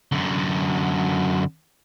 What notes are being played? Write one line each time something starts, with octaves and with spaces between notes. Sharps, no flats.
F#2 D3